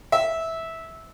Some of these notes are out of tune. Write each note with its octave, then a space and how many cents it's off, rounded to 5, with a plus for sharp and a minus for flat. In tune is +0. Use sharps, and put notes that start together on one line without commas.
E5 -15